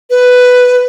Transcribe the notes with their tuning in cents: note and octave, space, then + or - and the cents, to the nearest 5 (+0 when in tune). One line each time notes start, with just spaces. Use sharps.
B4 +5